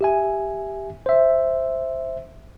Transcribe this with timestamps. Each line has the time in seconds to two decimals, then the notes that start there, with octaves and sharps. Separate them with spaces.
0.01 G4 E5 G#5
1.06 C5 E5